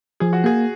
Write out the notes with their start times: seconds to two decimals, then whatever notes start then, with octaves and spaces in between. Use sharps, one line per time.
0.20 F3 G#4
0.33 F#4
0.44 A#3 G#4